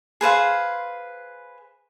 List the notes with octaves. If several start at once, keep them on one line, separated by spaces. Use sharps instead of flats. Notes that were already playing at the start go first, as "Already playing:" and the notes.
G#4 B4 C5 F5